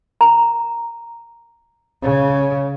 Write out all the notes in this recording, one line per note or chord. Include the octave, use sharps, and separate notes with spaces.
A#5
C#3